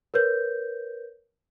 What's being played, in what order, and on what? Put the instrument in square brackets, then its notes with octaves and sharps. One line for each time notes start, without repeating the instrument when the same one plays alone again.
[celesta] A#4 B4 C#5 G6